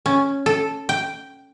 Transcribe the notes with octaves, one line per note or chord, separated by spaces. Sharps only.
C#4
A4
G5